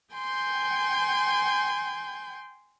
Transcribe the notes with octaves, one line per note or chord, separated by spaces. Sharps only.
G5 G#5 C6 G6